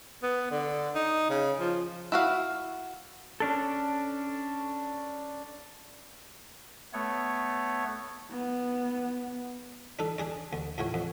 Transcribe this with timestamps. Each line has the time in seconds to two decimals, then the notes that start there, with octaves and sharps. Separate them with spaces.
0.23 B3
0.52 D3
0.95 D#4
1.30 C#3
1.60 F3
2.12 E4 F#4 F5
3.40 C#4 D4 A4
6.93 A3 B3 C#5
8.30 B3
9.99 D4 D#4 A4
10.18 D4 G#4 D5
10.53 D2
10.78 C#2 A2 C#3 C#5
10.94 F2